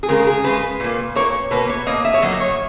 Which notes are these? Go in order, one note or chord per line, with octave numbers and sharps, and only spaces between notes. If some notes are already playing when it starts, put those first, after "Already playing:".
G#4
C#3 G#3 A#4
G#4
C#3 G#3 B4
A#2 A#3
A#2 A#3 C#5
B2 A#3 B4
C#5
B2 A#3 D#5
E5
C#5
A#2 F#3 A#3 D#5
C#5